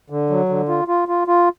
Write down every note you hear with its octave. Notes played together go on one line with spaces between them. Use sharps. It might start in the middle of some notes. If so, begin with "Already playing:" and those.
D3
F#3
D3
F4
F4
F4
F4